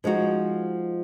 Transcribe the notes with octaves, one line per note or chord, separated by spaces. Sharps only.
F3 G#3 D#4 F#4